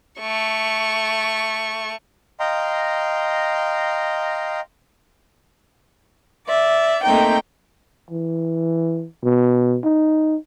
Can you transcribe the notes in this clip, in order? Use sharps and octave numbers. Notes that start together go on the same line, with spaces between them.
A3 C#6
D#5 F5 G5 A#5 C6
D5 E5
A3 A#3 C4 D#4 G5
E3
B2
D#4